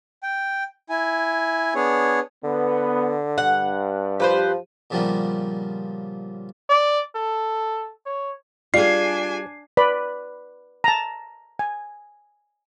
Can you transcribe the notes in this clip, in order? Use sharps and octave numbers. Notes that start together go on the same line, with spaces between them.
G5
E4 G#5
B3 D4 G#4 C#5
D3 B3
G2 F#5
F3 G4 B4 C5
A#2 C#3 F3 G3 A#3 B3
D5
A4
C#5
G3 D4 F4 G#4 G#5 C7
B4 D5 B5
A5 A#5
G#5